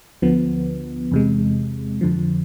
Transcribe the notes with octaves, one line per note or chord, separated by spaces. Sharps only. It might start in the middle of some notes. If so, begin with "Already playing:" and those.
D2 D3 F3 B3
E2 C3 G#3
F2 D3 F3